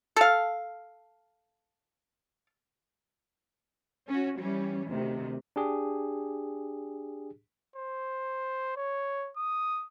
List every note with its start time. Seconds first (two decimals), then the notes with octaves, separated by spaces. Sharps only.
0.16 A4 F5
4.08 C#4 F#4
4.39 E3 G3 C#4
4.88 D2 C3 D#3
5.56 D4 G4 G#4
7.76 C5
8.76 C#5
9.37 D#6